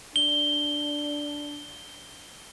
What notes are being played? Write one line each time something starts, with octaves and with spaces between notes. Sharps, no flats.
D4 G7